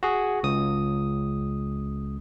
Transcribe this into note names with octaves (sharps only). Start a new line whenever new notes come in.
F#4 G#4
C#2 D#6